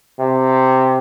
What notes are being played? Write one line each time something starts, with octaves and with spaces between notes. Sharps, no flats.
C3